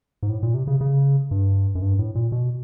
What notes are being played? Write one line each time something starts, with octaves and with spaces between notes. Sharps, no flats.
G#2
A2
A#2
C3
C#3
C#3
G2
F#2
G2
A2
A#2
B2